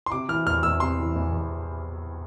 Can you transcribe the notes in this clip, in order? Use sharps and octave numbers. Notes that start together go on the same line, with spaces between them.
C6
C3 D6
E3 F6
E2 F6
E2 E6
C3 C6
E3
E2
E2